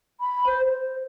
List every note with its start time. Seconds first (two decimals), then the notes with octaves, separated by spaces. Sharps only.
0.21 B5
0.46 C5
0.67 C5